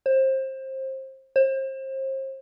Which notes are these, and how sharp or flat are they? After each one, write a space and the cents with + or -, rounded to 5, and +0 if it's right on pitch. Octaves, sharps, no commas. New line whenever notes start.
C5 +25
C5 +35